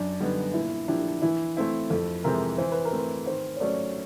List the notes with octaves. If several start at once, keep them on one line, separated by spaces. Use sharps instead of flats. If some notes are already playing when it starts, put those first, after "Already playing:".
Already playing: F#2 D4
D3 G3 B3 D#4
A#2 E4
F3 A#3 D4 E4 G4
E3 E4
A3 C4 E4
F2 A4
C3 E3 G#3 C4 A#4
E3 C5
B4
A#4
A3 C4
B4
D#3 C5
C#5
F#3 A3 C#4 D5